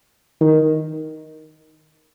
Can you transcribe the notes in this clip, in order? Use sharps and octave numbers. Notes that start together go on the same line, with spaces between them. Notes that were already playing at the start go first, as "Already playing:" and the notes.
D#3